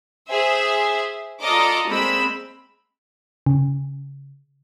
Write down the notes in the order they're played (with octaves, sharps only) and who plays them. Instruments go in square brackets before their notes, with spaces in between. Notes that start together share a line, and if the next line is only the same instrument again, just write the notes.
[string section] G#4 C5 E5
F4 A4 D5 D#5 A#5 D6
G#3 A#3 C4 B5 E6
[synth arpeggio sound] C#3